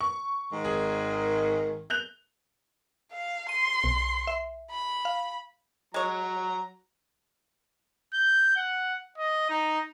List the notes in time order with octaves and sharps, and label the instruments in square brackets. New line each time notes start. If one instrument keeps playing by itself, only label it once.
[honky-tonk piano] C#6
[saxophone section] G#2 D#3
[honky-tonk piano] G#1 G#4
F#6 G6 F7
[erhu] F5
[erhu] C6 [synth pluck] D#7
[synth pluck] B1
E5
[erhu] B5
[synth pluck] F5
[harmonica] F#3 A#5 [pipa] G#3 C#5
[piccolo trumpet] G6
F#5
D#5
D#4